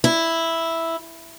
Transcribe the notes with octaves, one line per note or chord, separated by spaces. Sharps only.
E4